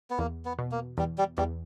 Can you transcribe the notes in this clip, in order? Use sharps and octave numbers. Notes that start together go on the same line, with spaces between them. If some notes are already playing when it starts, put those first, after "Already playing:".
B3
E2 A#3
B3
B2
A#3
E2 G3
G3
E2 G3